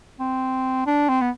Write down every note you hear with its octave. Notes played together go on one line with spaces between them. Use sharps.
C4
D4
C4
B3